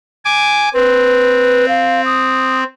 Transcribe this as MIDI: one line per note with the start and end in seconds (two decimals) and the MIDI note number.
0.25 0.69 80
0.25 0.69 86
0.74 2.64 60
0.74 1.69 71
1.69 2.02 77
2.05 2.59 87